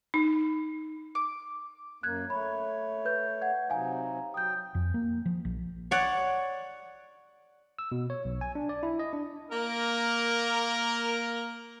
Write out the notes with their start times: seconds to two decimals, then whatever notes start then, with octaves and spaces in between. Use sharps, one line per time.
0.14 D#4
1.15 D6
2.03 F#2 A#3 F#6 G#6
2.30 A3 C#5 B5
3.05 B4 G6
3.42 F#5 G#6
3.70 C3 F#3 D#4 F5 G#5
4.34 F#3 G5 D#6 G6
4.75 F2
4.94 A#3
5.26 F3
5.45 A#1
5.91 C#5 D5 F#5
7.79 E6
7.92 B2
8.10 C#5
8.25 B1
8.41 G#5
8.55 D4
8.69 D5
8.83 E4
8.99 D#5
9.13 D4
9.51 A#3 A#4